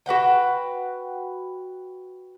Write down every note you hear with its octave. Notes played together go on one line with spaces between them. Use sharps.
F#4 B4 F#5 G5